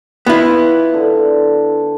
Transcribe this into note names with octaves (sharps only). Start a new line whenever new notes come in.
B3 E4 F4
D3